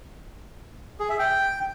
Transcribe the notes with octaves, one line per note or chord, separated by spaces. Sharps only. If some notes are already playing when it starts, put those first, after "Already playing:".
G#4
E5
G5